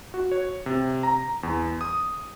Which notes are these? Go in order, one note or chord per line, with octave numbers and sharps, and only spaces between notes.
F#4
C#5
C3
A#5
E2
D#6